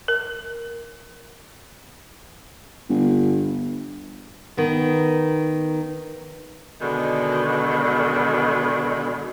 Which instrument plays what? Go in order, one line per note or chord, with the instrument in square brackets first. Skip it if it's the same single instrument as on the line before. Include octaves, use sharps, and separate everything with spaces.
[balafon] A#4
[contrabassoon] G1
[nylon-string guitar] D#3 B3
[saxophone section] B2 D3 D#3 G#3